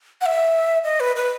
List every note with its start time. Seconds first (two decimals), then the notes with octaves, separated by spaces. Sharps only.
0.21 F#5
0.26 E5
0.84 D#5
1.00 B4
1.16 B4